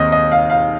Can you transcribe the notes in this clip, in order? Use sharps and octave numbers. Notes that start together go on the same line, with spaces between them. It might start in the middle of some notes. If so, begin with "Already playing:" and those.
Already playing: D#2 D#3 C4 D#5
D#5
F5
F5